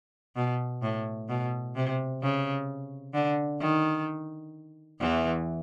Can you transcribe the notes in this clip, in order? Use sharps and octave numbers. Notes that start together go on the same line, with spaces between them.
B2
A2
B2
C3
C#3
D3
D#3
E2 E3